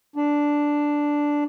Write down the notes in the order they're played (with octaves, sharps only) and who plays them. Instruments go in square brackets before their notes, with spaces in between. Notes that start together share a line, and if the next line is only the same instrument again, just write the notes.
[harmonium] D4